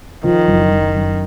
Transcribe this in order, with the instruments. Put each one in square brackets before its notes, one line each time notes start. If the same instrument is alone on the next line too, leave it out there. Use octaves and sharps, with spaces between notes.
[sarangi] D#3 [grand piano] F3
[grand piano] F#1
F#1
F#2